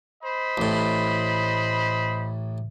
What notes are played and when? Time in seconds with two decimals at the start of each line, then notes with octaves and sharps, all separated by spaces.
0.23 C5 D#5 B5
0.57 A1 A2